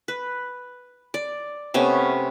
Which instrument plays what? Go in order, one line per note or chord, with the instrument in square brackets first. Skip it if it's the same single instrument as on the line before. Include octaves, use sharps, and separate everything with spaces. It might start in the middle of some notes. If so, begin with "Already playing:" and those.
[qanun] B4
D5
C3 A3 B3 C#4